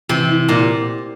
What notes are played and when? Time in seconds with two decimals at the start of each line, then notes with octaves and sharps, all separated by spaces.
0.09 C3 E3
0.29 E4
0.48 A#2 E4